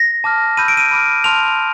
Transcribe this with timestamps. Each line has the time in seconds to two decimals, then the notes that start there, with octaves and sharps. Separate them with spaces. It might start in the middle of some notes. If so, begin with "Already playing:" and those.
Already playing: A#6
0.24 A5 D6 F6
0.57 B5 E6 G6 D#7
0.68 D7
0.77 D#7
0.91 B5 D6 F6
1.24 A5 C6 F6 F7